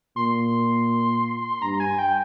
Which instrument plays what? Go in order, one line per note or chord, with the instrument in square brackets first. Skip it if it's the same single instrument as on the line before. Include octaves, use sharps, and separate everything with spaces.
[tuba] A#2 [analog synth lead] C6
[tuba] G2 [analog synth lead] A#5
[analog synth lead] G#5
G5